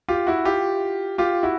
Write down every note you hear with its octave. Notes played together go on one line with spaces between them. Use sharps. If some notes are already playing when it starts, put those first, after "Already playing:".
F4 G4
E4 F#4
F4 G4
F4 G4
E4 F#4